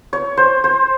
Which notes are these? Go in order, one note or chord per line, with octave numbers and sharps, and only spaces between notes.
C#5
C5
C5